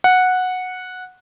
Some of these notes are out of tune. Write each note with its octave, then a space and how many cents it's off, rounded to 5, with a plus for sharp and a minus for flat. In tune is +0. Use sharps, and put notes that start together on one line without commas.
F#5 -10